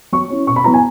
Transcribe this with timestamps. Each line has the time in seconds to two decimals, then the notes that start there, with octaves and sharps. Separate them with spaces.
0.12 F#3 C#6
0.30 C#4 E4
0.47 B2 C#6
0.56 B5
0.64 F#3 B3 E4 A#5
0.74 G#5